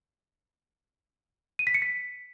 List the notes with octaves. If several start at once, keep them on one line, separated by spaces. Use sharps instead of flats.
D#7
B6
C#7
B6